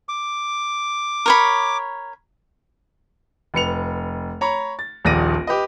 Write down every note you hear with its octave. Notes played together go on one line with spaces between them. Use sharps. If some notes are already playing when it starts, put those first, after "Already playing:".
D6
A#4 C#5 B5
F1 B4 C#7 F7
C#5 A#5 B5 C#6
A6
D#1 A#1 D5 A#6 D7 D#7
G4 B4 D#5